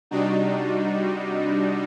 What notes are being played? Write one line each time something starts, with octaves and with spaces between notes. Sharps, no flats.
C3 G3 D4 D#4 F#4